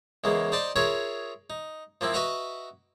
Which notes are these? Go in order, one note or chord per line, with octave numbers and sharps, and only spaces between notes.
E2 C#3 G#3 A#3
D#4 C5 D5 G5 A5 C6
F4 G#4 A#4 C#5 E5
D#4
F3 A#3 C4 E4
F#4 B4 D#5 E5 F#5 A#5